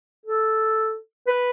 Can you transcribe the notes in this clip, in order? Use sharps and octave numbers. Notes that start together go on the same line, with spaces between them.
A4
B4